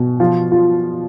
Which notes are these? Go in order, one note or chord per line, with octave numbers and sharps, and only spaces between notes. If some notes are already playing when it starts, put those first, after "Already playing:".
Already playing: B2
F3 F4
F4